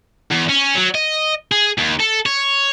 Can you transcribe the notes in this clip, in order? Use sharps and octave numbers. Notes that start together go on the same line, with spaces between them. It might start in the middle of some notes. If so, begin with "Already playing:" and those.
E2
C#4
F#3
D#5
G#4
D#2
A4
C#5